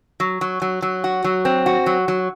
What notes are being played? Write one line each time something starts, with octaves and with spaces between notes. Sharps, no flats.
F#3
F#3
F#3
F#3
F#4
F#3
C4
F#4
F#3
F#3